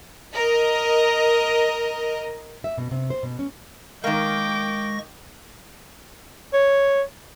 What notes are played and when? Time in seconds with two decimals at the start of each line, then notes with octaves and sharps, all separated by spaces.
0.33 A#4 D#5
2.64 E5
2.78 B2
2.91 C3
3.10 C5
3.23 B2
3.39 C#4
4.04 D#3 G#3 A#3 G5 C#6 D6 A#6
6.54 C#5